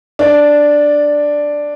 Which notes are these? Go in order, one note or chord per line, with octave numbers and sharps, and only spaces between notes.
D4